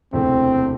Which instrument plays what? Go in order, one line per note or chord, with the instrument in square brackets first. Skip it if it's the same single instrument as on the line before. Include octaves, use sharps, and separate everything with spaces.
[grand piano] E1 D2 C3 E3 A3 [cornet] C4